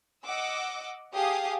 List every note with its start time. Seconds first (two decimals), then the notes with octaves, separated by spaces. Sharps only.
0.24 D#5 F#5 D6 E6
1.14 G4 G#4 F5 G#5 A5 D#6